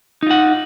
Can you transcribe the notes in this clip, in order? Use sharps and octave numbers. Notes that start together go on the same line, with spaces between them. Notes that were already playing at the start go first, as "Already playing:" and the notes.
D#4 F4 F#5